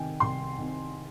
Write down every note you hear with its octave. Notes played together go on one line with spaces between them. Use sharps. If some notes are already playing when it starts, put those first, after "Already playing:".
Already playing: C3 D#3 G5 G#5
C2 C6
C3 D#3